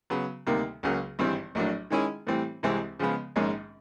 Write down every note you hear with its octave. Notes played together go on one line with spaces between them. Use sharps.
C#3 F#3 B3
D2 C3 D#3 G3 A#3
C#2 C#3 F#3 A#3
G#1 G2 E3 G3 C4
A#1 A2 F#3 A#3 D4
D#3 G#3 C#4 E4 G#4
A2 E3 G3 C4
C2 C3 E3 G#3 C4
C#3 F3 G#3 B3
A#1 G#2 D#3 G#3 C#4